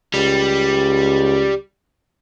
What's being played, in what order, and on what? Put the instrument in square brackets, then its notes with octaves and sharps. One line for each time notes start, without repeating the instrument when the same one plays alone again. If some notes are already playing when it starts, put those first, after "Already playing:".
[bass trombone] C#2 [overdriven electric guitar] G3